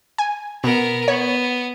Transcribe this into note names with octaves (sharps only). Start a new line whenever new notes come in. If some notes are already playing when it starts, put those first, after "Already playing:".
G#5
B2 B3 A#4
B3 C#5